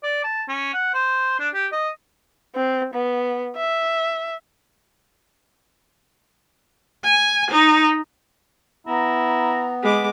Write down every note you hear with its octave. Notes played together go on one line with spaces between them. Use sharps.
D5
A5
C#4
F#5
C5
D4
G4
D#5
C4
B3
E5
G#5
D#4
B3 E4 A#5
G#3 B5 D6